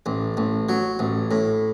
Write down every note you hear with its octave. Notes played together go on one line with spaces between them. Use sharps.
A1
A1
F#3
A1
A2